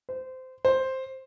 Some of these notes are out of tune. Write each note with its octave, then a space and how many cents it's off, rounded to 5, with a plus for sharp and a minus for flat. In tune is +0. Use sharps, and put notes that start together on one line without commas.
C5 -20
C5 +5